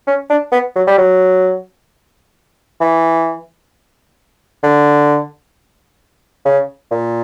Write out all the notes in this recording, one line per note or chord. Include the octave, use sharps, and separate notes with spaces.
C#4
D4
B3
F#3
G3
F#3
E3
D3
C#3
A#2